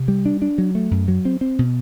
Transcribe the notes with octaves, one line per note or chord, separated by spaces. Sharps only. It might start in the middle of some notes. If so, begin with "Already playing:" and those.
Already playing: C3
G3
D4
D4
F#3
A3
F#2
F#3
C4
C4
B2